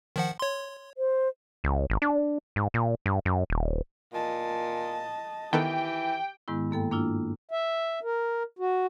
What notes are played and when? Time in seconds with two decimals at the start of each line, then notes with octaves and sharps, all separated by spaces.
0.16 D#3 F3 F#5
0.39 C#5 C6
0.98 C5
1.64 C#2
1.90 G#1
2.02 D4
2.56 G#2
2.74 A#2
3.06 G2
3.25 F#2
3.50 D#1
4.13 A#2 D#5 A5
5.53 D#3 E3 B3 G4 A4 G5
6.48 G#2 D#3 G#3 B3 E4
6.71 G2 A#3 A4 G5
6.91 A#3 D4 E4 F4
7.51 E5
8.03 A#4
8.59 F#4